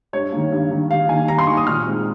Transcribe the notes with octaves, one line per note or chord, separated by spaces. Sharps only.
G2 C#5
D#3 A#3
G2
D#3 A#3
G2 F5
D#3 A#3 G#5
G2 A#5
C6
D#3 A#3 C#6
D#6
A#2 F6
G#3 C4 D#4